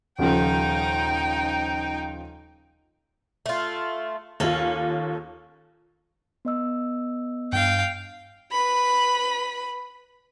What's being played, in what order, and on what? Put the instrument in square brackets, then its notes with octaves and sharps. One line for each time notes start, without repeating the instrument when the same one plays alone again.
[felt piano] D#1 C#3 F3 [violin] D#4 G5
[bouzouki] A3 F4
[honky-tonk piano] D#2 F4 [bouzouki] A#3 C#4 A4
[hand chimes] B3 D#5 E6
[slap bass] G2 D4 [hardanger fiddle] F5 G5
[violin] B4 B5